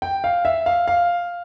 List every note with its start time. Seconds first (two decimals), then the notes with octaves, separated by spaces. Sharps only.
0.02 G5
0.24 F5
0.45 E5
0.66 F5
0.88 F5